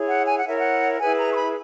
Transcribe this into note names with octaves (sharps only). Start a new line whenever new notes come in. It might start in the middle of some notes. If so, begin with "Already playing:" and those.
Already playing: E4 G#4 C#5
F#5
G#5
F#5
E4 A#4 C#5 E5
F#5
E4 G#4 B4 G#5
A#5
C#6
B5